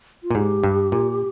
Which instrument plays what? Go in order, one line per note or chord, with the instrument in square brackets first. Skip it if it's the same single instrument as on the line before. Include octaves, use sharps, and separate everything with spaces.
[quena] F4
[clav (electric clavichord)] A#2
[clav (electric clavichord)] G#2 [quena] G4
[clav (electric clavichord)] G2
A#2